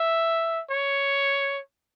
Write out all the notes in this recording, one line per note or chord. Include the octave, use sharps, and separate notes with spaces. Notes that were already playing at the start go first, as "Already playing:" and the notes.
Already playing: E5
C#5